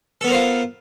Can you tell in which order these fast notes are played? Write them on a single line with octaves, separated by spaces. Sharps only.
A4 B3 A#4 C5 F4